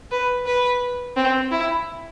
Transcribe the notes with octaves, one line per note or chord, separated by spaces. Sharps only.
B4
B4
C4
E4